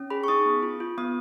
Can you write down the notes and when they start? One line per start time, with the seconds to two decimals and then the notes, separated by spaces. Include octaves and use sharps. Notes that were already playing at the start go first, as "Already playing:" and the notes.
Already playing: C#4
0.10 G#4 B5
0.24 C#6
0.28 D#4 D#6
0.45 B3
0.63 F4
0.80 F4
0.98 B3 D#6